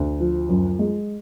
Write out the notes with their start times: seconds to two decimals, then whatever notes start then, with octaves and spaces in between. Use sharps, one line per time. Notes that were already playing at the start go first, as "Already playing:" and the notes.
Already playing: D2
0.20 F3
0.49 F#2
0.79 G#3